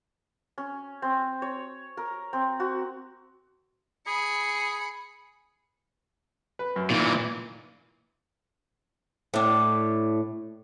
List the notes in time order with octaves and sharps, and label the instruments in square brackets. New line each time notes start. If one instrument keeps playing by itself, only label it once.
[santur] C#4
C4
C#5
A#4
C4
F#4
[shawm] G#4 [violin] B5 C#7
[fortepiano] B4
F#2
[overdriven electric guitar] A#2 E3 [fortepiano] D#3
[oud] A2 D4